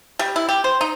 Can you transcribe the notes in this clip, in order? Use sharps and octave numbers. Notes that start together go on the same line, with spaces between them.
G3
E4
G4
C5
D#4